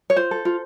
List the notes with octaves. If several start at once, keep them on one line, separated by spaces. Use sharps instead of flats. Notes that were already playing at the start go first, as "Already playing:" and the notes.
C#5
F4 C5
A4
F4